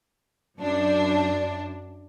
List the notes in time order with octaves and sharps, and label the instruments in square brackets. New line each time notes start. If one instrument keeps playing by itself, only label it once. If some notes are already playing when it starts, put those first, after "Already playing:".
[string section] F#2 D4